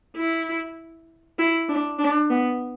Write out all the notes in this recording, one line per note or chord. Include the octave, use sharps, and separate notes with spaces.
E4
E4
D4
D4
B3